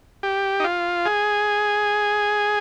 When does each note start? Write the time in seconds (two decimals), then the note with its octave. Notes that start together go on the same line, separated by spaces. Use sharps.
0.23 G4
0.60 D#4
0.64 F4
1.06 G#4